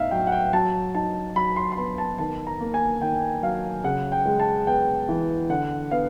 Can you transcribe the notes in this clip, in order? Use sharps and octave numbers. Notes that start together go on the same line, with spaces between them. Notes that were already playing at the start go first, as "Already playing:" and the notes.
Already playing: A2 B3 D#4 E5 F5
F#3 G5
F#5
G5
F#3 A5
D#4 A5
F#3 B5
C6
C6
B3 B5
A5
D#3 A5
A#5
A#3
G#5
D#3 G5
F#3 F5
C#3 F#5
G5
G#3
A5
B3 G5
E3
D3 F#5
B3 F5